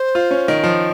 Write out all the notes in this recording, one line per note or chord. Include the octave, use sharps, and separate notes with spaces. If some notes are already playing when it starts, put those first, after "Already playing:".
Already playing: C5
F4
C#4
D#3
F3